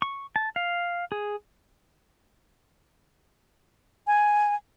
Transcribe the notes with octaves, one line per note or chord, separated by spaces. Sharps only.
C#6
A5
F5
G#4
G#5